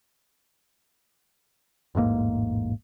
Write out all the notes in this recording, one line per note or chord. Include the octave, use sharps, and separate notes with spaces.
E1 A1 G#2 A#3